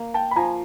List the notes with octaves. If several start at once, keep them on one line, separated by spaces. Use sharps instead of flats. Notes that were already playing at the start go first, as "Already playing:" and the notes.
Already playing: A#3
G5 A5
B5
F3 G#5 A#5